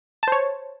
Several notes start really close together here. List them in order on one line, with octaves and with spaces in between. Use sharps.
A5 C5 C#5